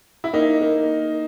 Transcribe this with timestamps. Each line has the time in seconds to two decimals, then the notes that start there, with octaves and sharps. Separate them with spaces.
0.24 E4
0.33 A#3 D#4
0.62 A#3